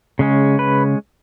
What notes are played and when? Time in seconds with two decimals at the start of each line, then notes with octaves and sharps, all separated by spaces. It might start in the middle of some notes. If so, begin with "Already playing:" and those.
0.19 C#3 G#3 C#4
0.59 B4